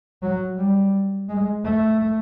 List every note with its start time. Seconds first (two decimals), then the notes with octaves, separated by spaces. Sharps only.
0.22 F#3
0.58 G3
1.29 G#3
1.65 A3